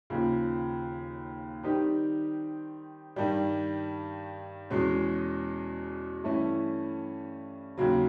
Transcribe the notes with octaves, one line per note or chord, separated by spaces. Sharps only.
D#2 C#3 F3
D#3 G3 C4 D#4 G4
G2 D#3 G3
E2 B2 G#3 C#4
G2 E3 A3 C#4 E4
D#2 C#3 F#3